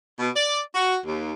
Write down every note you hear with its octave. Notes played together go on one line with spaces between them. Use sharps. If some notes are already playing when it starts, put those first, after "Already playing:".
B2
D5
F#4
D#2